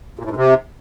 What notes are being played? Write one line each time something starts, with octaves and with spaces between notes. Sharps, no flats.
A#2
A2
G#2
C3